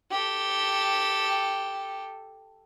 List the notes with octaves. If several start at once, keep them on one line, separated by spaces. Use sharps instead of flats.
G4 A4